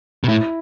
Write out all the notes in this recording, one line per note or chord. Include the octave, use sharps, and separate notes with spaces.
B2
A2 E4